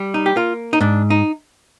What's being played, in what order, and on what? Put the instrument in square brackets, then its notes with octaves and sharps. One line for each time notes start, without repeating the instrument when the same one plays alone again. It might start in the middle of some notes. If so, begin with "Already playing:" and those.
Already playing: [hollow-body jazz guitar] G3
D#4
G4
A#3 F4
D#4
G#2 D4
D#4